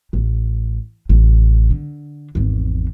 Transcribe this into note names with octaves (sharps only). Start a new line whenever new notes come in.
A1
A1 C3
D3
G#1 E2